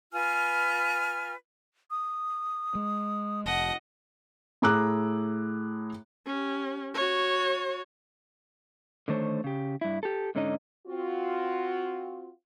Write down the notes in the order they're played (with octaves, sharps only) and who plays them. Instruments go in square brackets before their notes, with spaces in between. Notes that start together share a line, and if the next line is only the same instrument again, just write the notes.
[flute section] F4 B4 G#5 F6
[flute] D#6
[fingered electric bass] G#3
[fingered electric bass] F1 [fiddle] D#5 F#5 [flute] A5
[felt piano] A2 G#4 A#5 D6 E6 F#6
[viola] C#4 G4
F#4 C#5
[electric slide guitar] D3 D#3 A3 C5 C#5
C#3 G4
G2 E4
G4 A4
G#2 D3 C#4 D#4 D#5
[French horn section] C4 F4 F#4